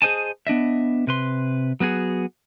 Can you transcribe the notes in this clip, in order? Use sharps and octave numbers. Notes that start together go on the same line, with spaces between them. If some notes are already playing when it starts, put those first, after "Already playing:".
G#4 A#4 C5 D#5 G#5 A5
B3 D4 D#5 E5
C3 B4 C6
F#3 B3 F#4 G#4